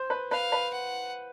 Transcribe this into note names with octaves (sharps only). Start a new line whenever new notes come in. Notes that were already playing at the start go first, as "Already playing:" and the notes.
Already playing: C5
B4
B4 F5
B4
F#5